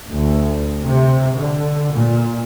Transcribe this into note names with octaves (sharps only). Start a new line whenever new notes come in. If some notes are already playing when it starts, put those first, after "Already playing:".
D2
C3
D3
A#2